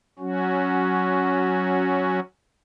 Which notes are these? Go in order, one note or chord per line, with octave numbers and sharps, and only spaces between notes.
F#3 C#4 F#4